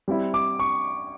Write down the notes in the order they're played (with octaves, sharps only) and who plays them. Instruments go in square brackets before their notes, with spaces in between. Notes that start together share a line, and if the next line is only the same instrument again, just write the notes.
[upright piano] G3 C4 E4
[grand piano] D6
C#6